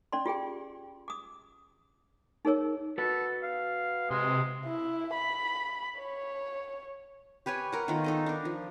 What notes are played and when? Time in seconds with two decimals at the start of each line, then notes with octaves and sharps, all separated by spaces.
0.12 C#4 D5 C6
0.26 F4 G4 G#4 G5
1.08 D6 D#6
2.45 D#4 G#4 A#4 C#5 E6
2.98 F#4 A4 B4
3.43 F5
4.10 C3 G#3 C6
4.66 E4
5.14 B5
6.00 C#5
7.46 G4 B4 C#5 G#5
7.72 A#4 F#5
7.88 D#3 A3 B3 F4
8.04 D#4 A4 D#5
8.26 D4 A#4
8.45 F3